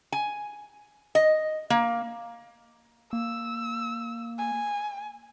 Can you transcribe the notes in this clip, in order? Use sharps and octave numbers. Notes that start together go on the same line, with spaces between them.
G#5
D#5
A#3
A#3 E6
G#5